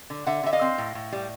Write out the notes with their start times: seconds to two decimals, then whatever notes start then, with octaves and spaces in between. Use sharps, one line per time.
0.10 D3
0.26 D3 E5 F#5
0.44 D3 E5
0.53 D#5 F5
0.61 C4
0.78 A2
0.95 A2
1.12 G3